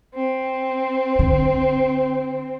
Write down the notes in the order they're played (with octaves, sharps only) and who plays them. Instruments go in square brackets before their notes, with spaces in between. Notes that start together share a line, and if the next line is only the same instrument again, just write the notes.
[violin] C4
[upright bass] D3